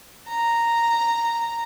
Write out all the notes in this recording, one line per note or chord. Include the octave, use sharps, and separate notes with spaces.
A#5